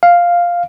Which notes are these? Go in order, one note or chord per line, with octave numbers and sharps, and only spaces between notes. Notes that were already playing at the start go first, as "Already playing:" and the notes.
F5